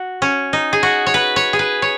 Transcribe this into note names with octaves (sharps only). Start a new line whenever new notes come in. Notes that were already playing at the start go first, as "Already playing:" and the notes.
Already playing: F#4
C#4
D#4
G#4
F#4
C#5
B4
C#5
G#4
B4
C#5